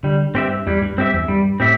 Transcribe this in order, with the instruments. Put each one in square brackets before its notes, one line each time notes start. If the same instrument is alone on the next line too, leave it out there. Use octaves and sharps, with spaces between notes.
[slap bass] D3 [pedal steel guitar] G3
[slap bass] G2 [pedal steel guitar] C4 G4 E5
[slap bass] E2 [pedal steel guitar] G3
[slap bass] G2
[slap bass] G2 [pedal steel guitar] C4 G4 E5
[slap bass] E2
[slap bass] G2 [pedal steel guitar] G3
[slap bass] A2 [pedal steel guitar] C4 G4 E5